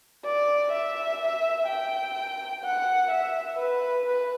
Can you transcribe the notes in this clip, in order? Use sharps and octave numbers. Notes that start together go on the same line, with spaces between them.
D5
E5
G5
F#5
E5
B4
B4